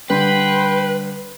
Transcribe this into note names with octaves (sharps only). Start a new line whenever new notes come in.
D3 G3 B4 G5 B5 C6